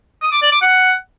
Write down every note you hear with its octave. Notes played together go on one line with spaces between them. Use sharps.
D#6
D6
D5
D6
F#5